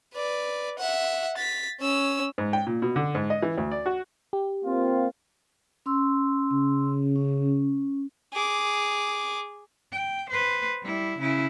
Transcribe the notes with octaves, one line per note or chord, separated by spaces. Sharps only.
B4 D5
E5 F#5
A6 B6
C#4 E6
G#2
G5
A#2
B2
D3
G#2
D#5
E3
D2
D5
F#4
G4
A#3 C4 F4
C#4 C6 E6
C#3
C#4
G#4 D6
G5
B4 C5
G3 E4
C#3 E4